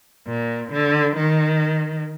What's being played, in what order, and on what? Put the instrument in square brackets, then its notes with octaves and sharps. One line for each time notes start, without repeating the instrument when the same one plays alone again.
[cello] A#2
D3
D#3